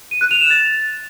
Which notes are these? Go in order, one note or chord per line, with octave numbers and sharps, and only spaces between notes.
D#7
F#6
F7
E7
A6